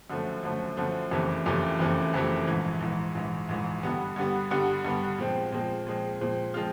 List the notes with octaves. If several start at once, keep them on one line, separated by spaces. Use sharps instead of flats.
F#2 D3 F3 A3
F#2 D3 F3 A3
F#2 D3 F3 A3
F#1 F2 C3 E3 A3
F#1 F2 C3 E3 A3
F#1 F2 C3 E3 A3
F#1 F2 C3 E3 A3
A#1 G#2 E3
A#1 G#2 E3
A#1 G#2 E3
A#1 G#2 E3
G2 D3 G3 B3
G2 D3 G3 B3
G2 D3 G3 B3
G2 D3 G3 B3
A#2 F3 G#3 C4
A#2 F3 G#3 C4
A#2 F3 G#3 C4
A#2 F3 G#3 C4
F3 G#3 C4 F4